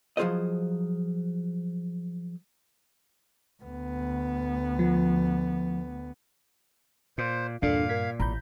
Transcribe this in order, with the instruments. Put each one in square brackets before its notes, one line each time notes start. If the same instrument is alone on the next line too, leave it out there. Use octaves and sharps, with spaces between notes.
[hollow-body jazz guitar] F3 F#3 F4 G#4 C5 D#5
[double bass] D2 B3
[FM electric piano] F3
[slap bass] A#2 [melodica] C5
[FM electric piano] E2 D4 A4 [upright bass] G2 [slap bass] A#2 [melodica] F5
[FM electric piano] A#4 G#6 B6
[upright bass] A1 [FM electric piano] A#5 B5 G6